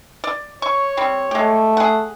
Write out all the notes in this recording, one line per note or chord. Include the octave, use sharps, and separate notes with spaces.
D5
C#5 C#6
G3 C4
G#3 A3 G4
G#4 F#5